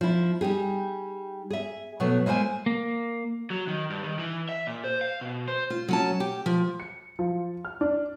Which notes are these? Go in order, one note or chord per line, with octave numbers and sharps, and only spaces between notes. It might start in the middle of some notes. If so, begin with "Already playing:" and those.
F3 E4
G3 D#4 G4 G#4
G#4 E5
B2 F#3 A3
G#3 A#3 E4 C5 G#5
A#3
F#3
D#3
G2
D#3
E3
E5
A#2
C5
F5
B2
C5
F4
F#3 C#4 A5
G4
F3
C#7
F3
F6
D4